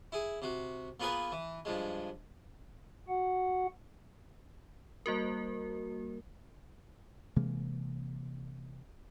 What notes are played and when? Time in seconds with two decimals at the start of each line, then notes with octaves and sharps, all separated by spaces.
0.12 E4 G#4
0.42 C3 F#4
1.00 A#3 B3 F4 G#4 A#4 B4
1.32 E3
1.65 G2 F3 G#3
3.08 F#4 F#5
5.06 G3 A#3 F#4 A#4
7.36 C3 E3 G#3 A#3